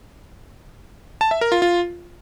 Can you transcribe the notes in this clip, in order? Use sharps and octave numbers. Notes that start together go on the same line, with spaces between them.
A5
E5
A#4
F4
F4